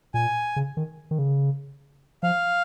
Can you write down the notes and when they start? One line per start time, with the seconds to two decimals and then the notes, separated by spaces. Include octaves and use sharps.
0.14 A#2 G#5
0.56 C#3
0.77 D#3
1.11 D#3
1.19 C#3
2.23 F3 F5